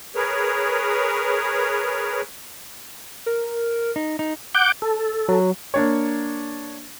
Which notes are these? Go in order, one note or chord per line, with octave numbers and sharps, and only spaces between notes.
G#4 A#4 B4 C#5
A#4
D#4
D#4
F#5 D6 G6
A4
F#3
A#3 D4 C#5